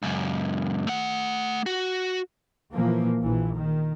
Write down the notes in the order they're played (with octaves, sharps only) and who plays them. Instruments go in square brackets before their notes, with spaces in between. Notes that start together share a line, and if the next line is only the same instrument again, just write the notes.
[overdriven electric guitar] C#2 F#2
A3 F#5
F#4
[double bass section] A#2 E3 F3 A#3
A#1 E3
D#3